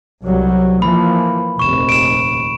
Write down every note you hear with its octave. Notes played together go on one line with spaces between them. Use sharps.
C2 F#3 G3
E3 F3 A#3 B5
F1 A#1 D#2 C#6 E7
D7 E7